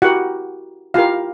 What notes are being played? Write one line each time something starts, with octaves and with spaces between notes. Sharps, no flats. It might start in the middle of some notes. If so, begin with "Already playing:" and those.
E4 F#4 G4 A#4 F#5
E4 F4 G4 A#4 F5